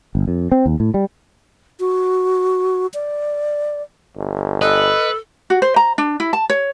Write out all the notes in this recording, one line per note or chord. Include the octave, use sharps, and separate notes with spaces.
G1
F2
C4
D#2
A2
G3
F#4
D5
G1
A4 B4 D#5
F#4
C5
A#5
D4
E4
A5
C#5